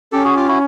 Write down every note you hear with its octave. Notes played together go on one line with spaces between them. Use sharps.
C#4 G4 A4
F#4 G#4
F4 G4
E4 F#4